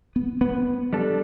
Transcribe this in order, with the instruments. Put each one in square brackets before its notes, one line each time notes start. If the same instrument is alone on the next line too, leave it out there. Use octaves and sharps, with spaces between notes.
[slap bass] B3
B3
[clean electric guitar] G3 D4 A4